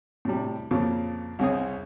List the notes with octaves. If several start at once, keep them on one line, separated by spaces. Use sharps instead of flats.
A2 C3 G3
F2 A#2 C#3 F3
C2 C#3 C4 G#4 C#5 D#6